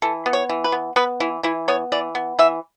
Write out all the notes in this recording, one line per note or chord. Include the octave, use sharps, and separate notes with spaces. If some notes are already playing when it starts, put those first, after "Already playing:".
E3 A4
B3
C#5
E3
B4
B3
B3 B4
E3 E4
E3 E4
B3 C#5
E3 D5
B3
E3 E5